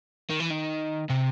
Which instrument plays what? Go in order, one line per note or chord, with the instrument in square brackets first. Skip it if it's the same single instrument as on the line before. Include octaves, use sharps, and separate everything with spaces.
[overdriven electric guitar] D#3
E3
D#3
C3